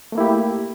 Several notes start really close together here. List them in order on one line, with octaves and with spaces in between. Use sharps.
A3 A#3 E4 G4